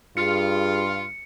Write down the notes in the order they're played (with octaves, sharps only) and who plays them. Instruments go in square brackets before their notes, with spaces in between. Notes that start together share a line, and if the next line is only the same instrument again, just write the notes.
[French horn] G2 [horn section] F4 [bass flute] G#4 [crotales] C#7